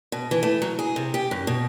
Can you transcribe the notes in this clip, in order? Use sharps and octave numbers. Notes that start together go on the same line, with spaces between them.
B2
E3
A3
F#3
G#4
C3
G4
F#2
B2